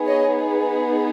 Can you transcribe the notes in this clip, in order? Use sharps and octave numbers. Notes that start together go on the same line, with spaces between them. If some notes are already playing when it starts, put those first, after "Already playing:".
Already playing: B3 D#4 G#4
C#5 D#5